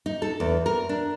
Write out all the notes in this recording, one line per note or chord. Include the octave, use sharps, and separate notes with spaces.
D#4
A4
E2
A#4
D4